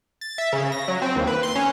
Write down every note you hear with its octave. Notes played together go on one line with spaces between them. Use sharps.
A6
E5
C#3
A#6
F#3
C4
D#2
B4
C6
C#4